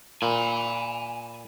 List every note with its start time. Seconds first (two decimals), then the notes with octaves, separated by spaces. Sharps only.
0.22 A#2 G#5 B5